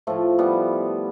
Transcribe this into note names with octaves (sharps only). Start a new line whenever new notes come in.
A2 F3 A3
G3 B3